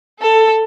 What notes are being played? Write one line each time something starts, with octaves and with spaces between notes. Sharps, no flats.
A4